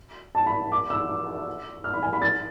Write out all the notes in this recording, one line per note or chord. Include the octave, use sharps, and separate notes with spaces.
A5
B5
D6
E6
F6
B5
G#5
B5
A6